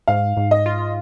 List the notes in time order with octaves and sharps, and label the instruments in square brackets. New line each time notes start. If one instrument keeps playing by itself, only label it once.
[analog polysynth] G#2 [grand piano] F5
[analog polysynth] G#2
[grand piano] D#5
[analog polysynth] F4